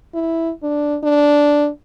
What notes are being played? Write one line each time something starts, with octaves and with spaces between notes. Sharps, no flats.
E4
D4
D4